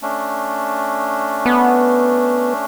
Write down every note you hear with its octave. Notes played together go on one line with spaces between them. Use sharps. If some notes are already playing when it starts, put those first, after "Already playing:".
A3 C#4 D4
B3